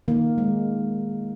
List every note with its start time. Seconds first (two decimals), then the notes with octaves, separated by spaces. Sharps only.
0.08 D#3 A#3
0.38 G#3